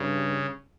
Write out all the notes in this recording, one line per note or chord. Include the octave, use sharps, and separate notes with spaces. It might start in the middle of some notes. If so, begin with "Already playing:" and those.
Already playing: G2 C#3